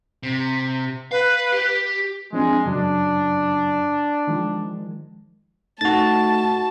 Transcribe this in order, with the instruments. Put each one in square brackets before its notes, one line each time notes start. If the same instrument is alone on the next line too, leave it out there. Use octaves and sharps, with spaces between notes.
[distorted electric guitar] C3
[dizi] B4 [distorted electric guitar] F5
[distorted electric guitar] G4
[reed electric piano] F3 C4 D4 [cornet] G#3
[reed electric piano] F#2 C#3 F#3 [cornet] D4
[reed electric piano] D#3 F3 G#3
[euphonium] A3 [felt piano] D#4 [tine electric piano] F#4 A6 [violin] A5